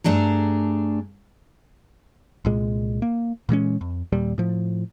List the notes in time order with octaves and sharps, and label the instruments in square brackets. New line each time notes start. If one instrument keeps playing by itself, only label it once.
[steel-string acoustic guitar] G2 A3 D4 G#4 A#5
[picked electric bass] C2 A#2 G#3
A#3
A#2 E3 G#3 C#4
F2
D#2 A#2 G3
A2 F3